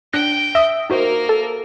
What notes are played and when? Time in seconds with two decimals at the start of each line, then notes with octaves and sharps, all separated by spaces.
0.13 D4 G5 F#6 A#6
0.55 E5 D#6 A#6
0.90 A#3 D#4 F#4 A#4 C5
1.29 A4